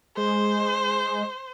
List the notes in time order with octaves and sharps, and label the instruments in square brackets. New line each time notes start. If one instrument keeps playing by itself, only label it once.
[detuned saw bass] G#3 [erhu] C5